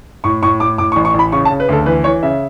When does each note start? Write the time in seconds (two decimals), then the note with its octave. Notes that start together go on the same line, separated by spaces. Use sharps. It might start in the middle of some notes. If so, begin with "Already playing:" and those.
0.24 A2 C#6
0.42 A2 C#6
0.60 A2 D6
0.78 A2 D6
0.92 C#6
0.96 A1
1.05 C#6
1.14 A1 B5
1.32 C#3 C#6
1.45 A5
1.50 C#3
1.60 B4
1.69 D2 A4
1.86 E3 B4
2.04 E3 C#5
2.23 C#3 E5